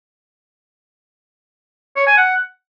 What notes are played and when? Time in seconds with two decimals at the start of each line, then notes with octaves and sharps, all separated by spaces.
1.97 C#5
2.07 G#5
2.18 F#5